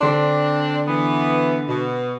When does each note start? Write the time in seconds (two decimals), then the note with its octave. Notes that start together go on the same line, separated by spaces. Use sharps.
0.01 D3 C4 D4 C6
0.88 E3 B3
1.68 B2